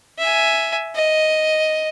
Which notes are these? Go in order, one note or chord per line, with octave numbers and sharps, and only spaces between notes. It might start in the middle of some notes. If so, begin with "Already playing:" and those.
E5 G#5
D#5